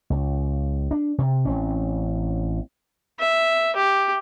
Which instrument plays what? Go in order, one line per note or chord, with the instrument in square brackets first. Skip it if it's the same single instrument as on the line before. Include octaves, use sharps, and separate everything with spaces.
[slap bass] C#2
D4
C3
A1 C4 C#4
[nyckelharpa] E5
G4